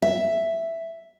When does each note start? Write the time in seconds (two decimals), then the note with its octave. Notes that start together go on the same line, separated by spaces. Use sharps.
0.02 E5